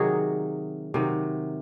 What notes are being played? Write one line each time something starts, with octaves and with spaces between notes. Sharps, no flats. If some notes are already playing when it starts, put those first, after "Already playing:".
Already playing: C3 D#3 F#3 D#4 F#4 G#4
C3 D#3 F#3